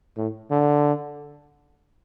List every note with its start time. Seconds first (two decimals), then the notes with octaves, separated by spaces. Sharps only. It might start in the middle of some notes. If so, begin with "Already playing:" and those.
0.17 A2
0.51 D3